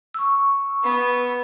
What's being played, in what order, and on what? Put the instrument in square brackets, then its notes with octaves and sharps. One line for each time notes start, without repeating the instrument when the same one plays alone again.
[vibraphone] C#6 E6
[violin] B3